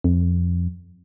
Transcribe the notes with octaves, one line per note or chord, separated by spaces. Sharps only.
F2